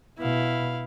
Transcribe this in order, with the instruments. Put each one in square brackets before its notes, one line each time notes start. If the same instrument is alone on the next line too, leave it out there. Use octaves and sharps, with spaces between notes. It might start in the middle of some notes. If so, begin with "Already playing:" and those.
[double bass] B2 [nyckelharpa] E4 F5